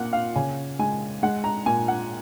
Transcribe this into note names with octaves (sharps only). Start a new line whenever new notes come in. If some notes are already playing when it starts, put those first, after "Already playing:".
Already playing: A#2 A#3 F#5
F5
C#3 G#5
G#3 G#5
G#3 F#5
A#5
A#2 G#5
F#5